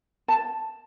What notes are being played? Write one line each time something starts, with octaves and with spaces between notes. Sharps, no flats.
A5